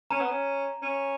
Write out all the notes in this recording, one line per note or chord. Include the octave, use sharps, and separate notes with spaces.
C#4 A#5
B3
C#4
C#4